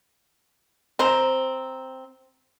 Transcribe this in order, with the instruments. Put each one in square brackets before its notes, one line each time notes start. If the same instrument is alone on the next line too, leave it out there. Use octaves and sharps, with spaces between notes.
[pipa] C4 C5 A#5